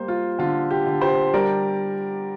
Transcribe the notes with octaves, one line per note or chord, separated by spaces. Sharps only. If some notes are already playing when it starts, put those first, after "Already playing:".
Already playing: G3 A#3 C5
F4
D3 F4
G4
D3
G4 C5
G3 A#4 D5